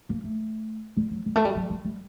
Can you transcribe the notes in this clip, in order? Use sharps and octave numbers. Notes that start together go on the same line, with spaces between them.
A#3
A3
G3
F#3
G3
A3
G3
F#3
G#3
G3